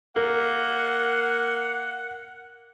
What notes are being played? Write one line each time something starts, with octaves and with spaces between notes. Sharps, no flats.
A#3 A#4 F#5